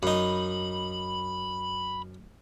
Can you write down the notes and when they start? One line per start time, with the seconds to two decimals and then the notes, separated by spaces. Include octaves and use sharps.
0.03 F#2 D#4 B5